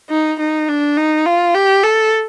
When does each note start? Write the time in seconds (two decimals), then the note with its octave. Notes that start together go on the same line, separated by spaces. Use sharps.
0.10 D#4
0.39 D#4
0.68 D4
0.97 D#4
1.26 F4
1.55 G4
1.83 A4